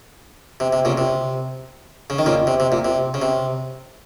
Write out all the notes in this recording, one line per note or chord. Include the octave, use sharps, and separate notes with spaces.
C3
C3
A#2 C#3
C3
C#3
D#3
A#2 C#3
C3
C3
A#2
C3
C#3
C3